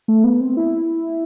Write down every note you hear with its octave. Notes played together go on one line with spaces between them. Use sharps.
A3
B3
C4
E4